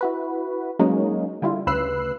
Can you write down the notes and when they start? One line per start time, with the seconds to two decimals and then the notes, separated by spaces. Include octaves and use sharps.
0.01 E4 F#4 B4
0.79 F#3 G#3 A#3 C#4 D#4
1.42 D3 G3 E4 F4
1.67 D2 C#3 B4 E6 F#6 C7